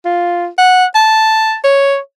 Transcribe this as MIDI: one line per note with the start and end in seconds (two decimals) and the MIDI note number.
0.05 0.47 65
0.58 0.84 78
0.95 1.55 81
1.64 1.97 73